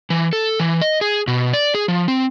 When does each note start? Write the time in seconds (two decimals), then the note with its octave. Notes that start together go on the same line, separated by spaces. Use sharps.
0.10 E3
0.33 A4
0.60 E3
0.81 D#5
1.01 G#4
1.27 B2
1.53 D5
1.75 G#4
1.88 F3
2.08 C4